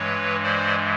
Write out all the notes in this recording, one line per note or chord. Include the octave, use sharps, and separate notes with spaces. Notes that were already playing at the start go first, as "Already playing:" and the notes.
Already playing: G2 E3 G#3 B4 C#5
C5 D5